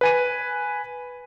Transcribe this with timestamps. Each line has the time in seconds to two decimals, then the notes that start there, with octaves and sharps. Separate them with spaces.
0.01 B4 G#5 D#7